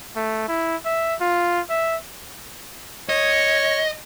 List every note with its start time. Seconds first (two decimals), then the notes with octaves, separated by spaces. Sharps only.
0.16 A3
0.48 E4
0.86 E5
1.21 F4
1.70 E5
3.09 C#5 D#5